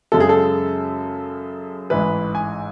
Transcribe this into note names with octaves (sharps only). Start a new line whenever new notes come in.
F#2 C#3 G#3 A4
G#4
A4
A1 G#2 E3 B4
G#5